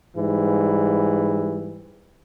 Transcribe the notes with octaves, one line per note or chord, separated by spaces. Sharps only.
G#2 E3 G3